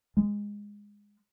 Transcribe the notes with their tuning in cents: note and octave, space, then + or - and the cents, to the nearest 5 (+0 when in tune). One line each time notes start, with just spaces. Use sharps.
G#3 -15